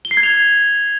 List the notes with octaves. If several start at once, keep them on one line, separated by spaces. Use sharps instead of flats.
G7
C7
G#6
F7